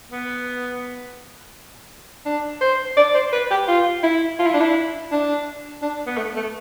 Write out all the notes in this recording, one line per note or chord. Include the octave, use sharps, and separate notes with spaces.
B3
D4
C5
D5
C5
B4
G4
F4
E4
F4
E4
D4
E4
D4
D4
B3
A3
A3